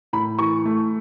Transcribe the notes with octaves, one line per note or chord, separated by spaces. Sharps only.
A2 B5
E3 C#6
A3